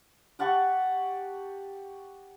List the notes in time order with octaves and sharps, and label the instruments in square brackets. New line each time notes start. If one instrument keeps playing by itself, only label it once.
[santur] G4 F#5 A5 C#6